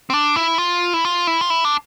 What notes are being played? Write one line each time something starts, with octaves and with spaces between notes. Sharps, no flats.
C4
D4
E4
F4
E4
F4
E4
F4
E4
D4